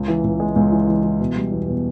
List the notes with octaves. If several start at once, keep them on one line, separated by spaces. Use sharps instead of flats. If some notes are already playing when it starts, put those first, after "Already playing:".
Already playing: C#2
E3
C#2
G#3
C#2
E3
E3
E3
B2
G3
E2
B2